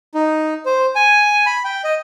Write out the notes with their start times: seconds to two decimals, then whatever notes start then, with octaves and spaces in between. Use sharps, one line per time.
0.14 D#4
0.66 C5
0.95 G#5
1.46 B5
1.65 G5
1.84 D#5